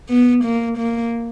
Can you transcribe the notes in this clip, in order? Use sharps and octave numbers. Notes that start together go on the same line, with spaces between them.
B3
A#3
A#3